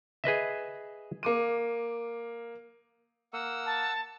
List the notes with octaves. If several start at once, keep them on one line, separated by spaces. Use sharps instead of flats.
G#4 B4 D#5 E5
A#3 D6 D#7
A#3 F#5 E6
A5